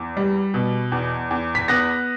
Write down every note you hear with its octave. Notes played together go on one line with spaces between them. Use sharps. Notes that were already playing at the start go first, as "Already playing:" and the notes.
Already playing: E2
G3
B2
E2
E2
B6
B3 F#6 A#6